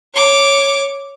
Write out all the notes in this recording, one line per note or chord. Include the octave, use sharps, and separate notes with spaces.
C#5 D6